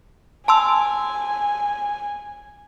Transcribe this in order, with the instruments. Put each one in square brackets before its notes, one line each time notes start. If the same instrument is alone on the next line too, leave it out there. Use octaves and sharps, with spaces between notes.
[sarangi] G#5 [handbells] A5 C6 E6